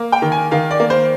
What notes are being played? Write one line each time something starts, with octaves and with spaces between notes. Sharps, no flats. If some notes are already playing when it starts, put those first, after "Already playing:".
Already playing: A#3
G5
D#3
G#5
D#3 F5
D5
A#3
C5